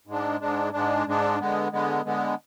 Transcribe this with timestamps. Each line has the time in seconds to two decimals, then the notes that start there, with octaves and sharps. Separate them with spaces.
0.07 G#2 G#3 D4
0.41 G#2 G#3 D4
0.73 G#2 G#3 D4
1.06 G#2 G#3 D4
1.40 D3 G#3 B3
1.72 D3 G#3 B3
2.05 D3 G#3 B3